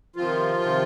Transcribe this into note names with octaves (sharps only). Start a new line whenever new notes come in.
C3 D#3 F3 F4
C3 D#3